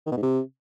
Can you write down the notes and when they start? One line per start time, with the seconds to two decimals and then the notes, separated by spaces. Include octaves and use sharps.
0.06 D#3
0.12 B2
0.17 G#2
0.22 C3